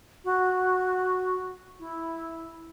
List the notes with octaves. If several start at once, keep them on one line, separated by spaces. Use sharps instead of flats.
F#4
E4